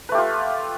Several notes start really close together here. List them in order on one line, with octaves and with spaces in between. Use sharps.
B4 A3 G4 F4